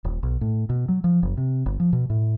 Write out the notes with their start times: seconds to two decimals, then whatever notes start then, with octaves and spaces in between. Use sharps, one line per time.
0.04 D#1
0.23 B1
0.41 A2
0.70 B2
0.89 F#3
1.04 F3
1.23 F#1
1.37 C3
1.66 G1
1.80 F3
1.93 B2
2.10 A2